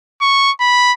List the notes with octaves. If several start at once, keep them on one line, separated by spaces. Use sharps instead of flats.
C#6
B5